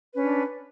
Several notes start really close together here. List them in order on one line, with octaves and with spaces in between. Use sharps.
B4 C#4 D4